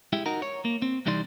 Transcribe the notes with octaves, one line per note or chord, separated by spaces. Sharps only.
G#3 E4 G4
D#4 F#4 A#4
C#5
A#3
C4
C2 E3 G3 D#4 D5 C6